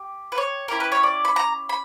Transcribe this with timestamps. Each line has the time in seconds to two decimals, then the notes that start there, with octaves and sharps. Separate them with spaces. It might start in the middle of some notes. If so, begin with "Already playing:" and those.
Already playing: G4
0.32 B4
0.38 C#5
0.68 C#4 E4 G4 A#4
0.80 B4
0.92 C#5
1.03 D5
1.25 B5
1.36 A#5
1.69 B5